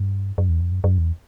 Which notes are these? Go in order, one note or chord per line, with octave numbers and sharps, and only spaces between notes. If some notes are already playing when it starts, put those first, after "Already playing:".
Already playing: G2
F#2
E2
F2
F#2
F#2
E2